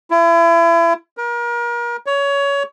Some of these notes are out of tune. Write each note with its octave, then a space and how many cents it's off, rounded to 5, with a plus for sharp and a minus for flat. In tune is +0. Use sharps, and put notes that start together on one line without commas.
E4 +35
A#4 +35
C#5 +20